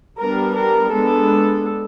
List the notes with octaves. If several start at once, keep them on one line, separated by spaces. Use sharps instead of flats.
G3 B3 D4 A#4
A#4
G#3 B3 D4 A4